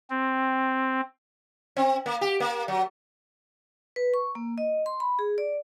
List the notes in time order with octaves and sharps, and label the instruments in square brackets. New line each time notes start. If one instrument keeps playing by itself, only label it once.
[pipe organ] C4
[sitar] C4
A#3
G4
A#3
F#3
[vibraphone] B4
C#6
A#3
D#5
C6
B5
G#4
D5